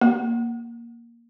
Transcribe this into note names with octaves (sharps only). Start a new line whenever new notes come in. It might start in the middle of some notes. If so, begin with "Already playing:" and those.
A#3